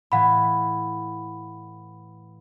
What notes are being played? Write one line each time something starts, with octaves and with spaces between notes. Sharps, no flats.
A2 E3 F5 F#5 B5 G#6